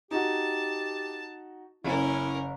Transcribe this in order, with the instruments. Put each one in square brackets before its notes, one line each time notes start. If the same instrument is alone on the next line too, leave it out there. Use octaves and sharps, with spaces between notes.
[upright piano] D#4 F#4 [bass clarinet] G4 [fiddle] A5
[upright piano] F#1 [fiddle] C#4 A#4 [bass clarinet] E4